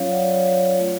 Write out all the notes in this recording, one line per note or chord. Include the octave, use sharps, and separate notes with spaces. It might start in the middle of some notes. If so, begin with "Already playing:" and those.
Already playing: F#3 C#4 F4 C#5 F5
D5 F#5
C#5 F5
A3 F4